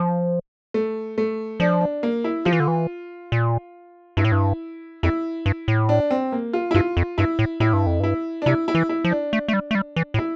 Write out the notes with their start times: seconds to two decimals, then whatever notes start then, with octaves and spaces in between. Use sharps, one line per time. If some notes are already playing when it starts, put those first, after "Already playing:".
Already playing: F3
0.74 A3
1.18 A3
1.60 F3 D4
1.81 D4
2.03 A#3
2.24 E4
2.45 F3 F4
2.53 E3
2.60 D3
2.68 E3
3.32 A#2
4.17 G2 E4
4.25 A2
4.32 G2
5.03 F2 E4
5.46 G2
5.68 A2
5.89 D4
6.11 C4
6.32 A#3
6.53 F4
6.71 E4
6.74 G2 F4
6.97 F2
7.18 G2 E4
7.39 A2
7.60 A2 E4
7.73 G2
7.86 F2
8.00 G2 E4
8.42 D4
8.46 C3 E4
8.68 E4
8.75 E3
8.89 E4
9.04 F3
9.11 D4
9.33 A3
9.48 A3
9.53 G3
9.71 A3
9.75 G3
9.96 E3
10.14 A2
10.18 E4